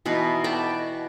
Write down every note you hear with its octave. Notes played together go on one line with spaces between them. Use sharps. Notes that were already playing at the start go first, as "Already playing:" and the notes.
B2 E3 D#4 B4
D5 G5 A5